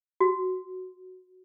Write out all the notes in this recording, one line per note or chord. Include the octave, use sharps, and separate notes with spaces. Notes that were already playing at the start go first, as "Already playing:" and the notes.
F#4